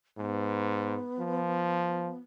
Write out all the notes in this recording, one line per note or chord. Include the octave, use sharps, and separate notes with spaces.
G#2 B3
F3